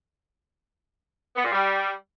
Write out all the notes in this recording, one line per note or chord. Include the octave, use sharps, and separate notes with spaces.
B3
A#2
G3